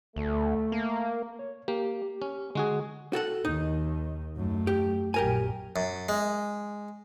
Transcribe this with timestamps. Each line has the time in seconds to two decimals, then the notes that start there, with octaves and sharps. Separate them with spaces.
0.16 D2 A3
0.72 A#3
1.39 C#5
1.68 A#3 G4
2.22 C#4
2.55 D3 G#3 F#4 G#4
3.13 F#4 A4 F#5
3.45 D#2 D#3 D#4
4.36 F#2 A3
4.67 G4
5.14 A#1 F#2 G4 A#4 G#5
5.76 F#2
6.09 G#3